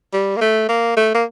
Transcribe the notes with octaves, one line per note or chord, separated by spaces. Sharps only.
G3
A#3
A3
A#3
A3
A#3